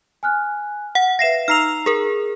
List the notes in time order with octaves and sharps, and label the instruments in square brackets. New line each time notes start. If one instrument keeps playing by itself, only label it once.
[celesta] G#5 F6 F#6
[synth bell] F#5
[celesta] B4 E5 F5 [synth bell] A#6 C7 E7
[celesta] D#4 A#5 E6 [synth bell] F6 C7 F7
[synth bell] G#4 A#4